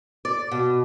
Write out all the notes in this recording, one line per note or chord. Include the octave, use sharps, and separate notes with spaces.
D5
B2